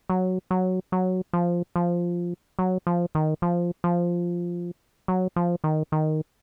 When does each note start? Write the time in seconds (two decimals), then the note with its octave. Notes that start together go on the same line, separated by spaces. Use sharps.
0.10 F#3
0.51 F#3
0.92 F#3
1.33 F3
1.76 F3
2.59 F#3
2.87 F3
3.15 D#3
3.42 F3
3.84 F3
5.08 F#3
5.36 F3
5.64 D#3
5.92 D#3